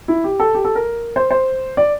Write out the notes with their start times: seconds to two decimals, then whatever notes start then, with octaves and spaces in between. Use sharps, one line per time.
0.08 E4
0.24 G4
0.40 A4
0.55 G4
0.65 A4
0.75 A#4
1.16 C5
1.31 C5
1.77 D5